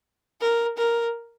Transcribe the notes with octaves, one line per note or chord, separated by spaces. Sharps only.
A#4
A#4